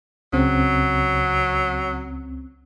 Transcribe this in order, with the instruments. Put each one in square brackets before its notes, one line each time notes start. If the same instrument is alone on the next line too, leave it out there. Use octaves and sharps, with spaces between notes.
[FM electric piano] C#2 C#3 C4 [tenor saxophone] F#3